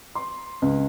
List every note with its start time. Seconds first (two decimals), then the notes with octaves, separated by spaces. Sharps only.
0.15 C6
0.62 C#2